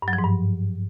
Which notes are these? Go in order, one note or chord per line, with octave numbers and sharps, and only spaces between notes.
G2
F#3
F3
G#2
G2